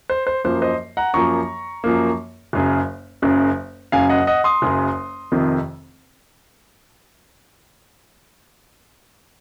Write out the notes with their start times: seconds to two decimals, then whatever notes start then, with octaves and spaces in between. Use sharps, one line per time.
0.09 C5
0.27 C5
0.44 F#2 F3 A#3 C5
0.62 C5 D#5
0.97 F#5 A#5
1.14 F#2 F3 A#3 A#5 C#6
1.84 F#2 F3 A#3
2.53 F#1 F#2 C#3
3.22 F#1 F#2 C#3
3.92 F#1 F#2 C#3 F5 G#5
4.09 D#5 F#5
4.27 D#5 F#5
4.44 C6 D#6
4.62 F#1 F#2 C#3
5.32 F1 F2 C3 D#3